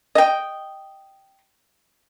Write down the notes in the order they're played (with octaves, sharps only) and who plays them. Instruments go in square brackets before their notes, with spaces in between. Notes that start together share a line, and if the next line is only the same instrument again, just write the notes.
[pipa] D#5 G5